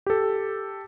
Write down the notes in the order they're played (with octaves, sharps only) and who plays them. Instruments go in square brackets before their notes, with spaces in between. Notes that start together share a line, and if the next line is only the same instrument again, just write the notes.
[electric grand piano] G4 A4